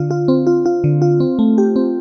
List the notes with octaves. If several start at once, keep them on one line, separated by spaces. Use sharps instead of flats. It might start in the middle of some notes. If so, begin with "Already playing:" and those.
Already playing: D3 F4
F4
C4
F4
F4
D3
F4
C4
A3
G4
C4